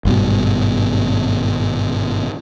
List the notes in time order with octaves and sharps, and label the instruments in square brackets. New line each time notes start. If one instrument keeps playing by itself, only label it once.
[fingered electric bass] G#1 G2 B2